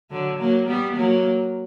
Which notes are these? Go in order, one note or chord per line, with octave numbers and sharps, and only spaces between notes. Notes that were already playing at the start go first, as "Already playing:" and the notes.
D3 F#3
F#3 A#3
G3 B3
F#3 A#3